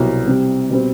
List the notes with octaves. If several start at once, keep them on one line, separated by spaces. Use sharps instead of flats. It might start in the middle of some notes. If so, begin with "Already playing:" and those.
Already playing: C2 B2 F#3
C3 G3 C4
B2 G3 C4